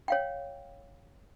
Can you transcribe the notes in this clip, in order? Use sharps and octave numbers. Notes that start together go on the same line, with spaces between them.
C#5 F5 G5